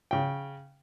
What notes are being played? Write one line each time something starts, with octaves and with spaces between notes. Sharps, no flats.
C#3 G5